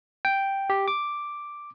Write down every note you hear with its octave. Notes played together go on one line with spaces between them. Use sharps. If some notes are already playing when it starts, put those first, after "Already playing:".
G5
G4
D6